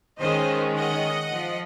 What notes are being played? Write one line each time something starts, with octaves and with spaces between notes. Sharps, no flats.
D#3 G#3 C#4 C5 D#5
D#5 F#5
F3